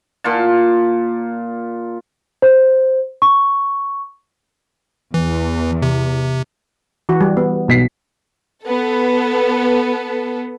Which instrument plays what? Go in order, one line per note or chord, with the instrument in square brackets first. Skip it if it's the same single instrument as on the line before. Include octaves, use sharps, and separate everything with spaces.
[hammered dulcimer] A#2 F4 A5
[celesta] C5
C#6
[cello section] E2 [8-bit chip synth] E3
[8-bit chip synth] C3
[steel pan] E3 F#4
G3
B3
[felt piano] B1 B6 C7
[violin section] B3 A4